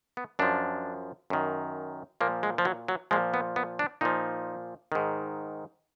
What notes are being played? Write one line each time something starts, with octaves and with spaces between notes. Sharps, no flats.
B3
F#2 F3 D4
F#2 D#3
A#2 F3 A#3
G#3
F3
F#3
F#3
A#2 F3 G#3
B3
B3
D4
A#2 F3 D#4
G#2 D#3